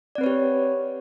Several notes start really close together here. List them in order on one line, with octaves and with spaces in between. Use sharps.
D5 C4 B4 C#5 G4